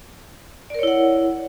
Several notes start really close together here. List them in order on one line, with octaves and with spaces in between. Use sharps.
D5 A#4 C#5 E4 F#5